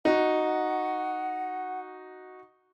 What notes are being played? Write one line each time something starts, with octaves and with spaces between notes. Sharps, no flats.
D#4 F#4 F#5